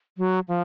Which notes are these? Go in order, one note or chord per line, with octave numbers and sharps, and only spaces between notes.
F#3
F3